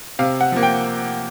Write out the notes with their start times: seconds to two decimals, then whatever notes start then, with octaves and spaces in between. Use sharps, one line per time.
0.19 C3 F5
0.41 F#5
0.52 F3 A#3
0.63 G5